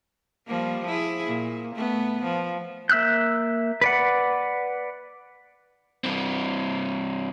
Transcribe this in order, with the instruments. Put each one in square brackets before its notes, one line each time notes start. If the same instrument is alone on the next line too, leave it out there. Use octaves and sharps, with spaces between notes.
[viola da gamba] F3 G3 A#3
E4 G#4
A#2
A3 B3
F3
[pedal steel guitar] A#3 E5 E6 F#6 G6
B4 D5 F#5
[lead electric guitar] G2 C4